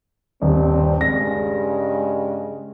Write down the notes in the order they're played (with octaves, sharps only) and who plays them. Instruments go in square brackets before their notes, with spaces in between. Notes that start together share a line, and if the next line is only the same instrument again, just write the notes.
[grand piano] D#1 [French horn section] G2 C4
[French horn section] G2 C#3 G#3 [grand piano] A#6